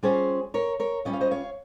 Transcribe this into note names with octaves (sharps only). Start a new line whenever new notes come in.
G3 C#4 F4 G#4 C5
A#4 C#5
A#4 C#5
G3 C#4 F4 D#5
F5
C5 D#5
C#5 F5